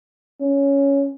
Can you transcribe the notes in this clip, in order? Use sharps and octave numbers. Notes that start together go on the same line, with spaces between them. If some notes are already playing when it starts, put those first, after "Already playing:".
C#4